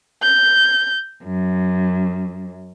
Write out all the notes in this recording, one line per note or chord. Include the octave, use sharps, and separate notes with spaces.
G6
F#2